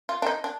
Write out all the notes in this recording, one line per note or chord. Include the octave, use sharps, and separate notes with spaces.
F4
D4
D#4
D4